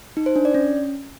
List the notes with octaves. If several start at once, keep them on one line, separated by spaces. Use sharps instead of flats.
D#4
C5
D4
D5
C#4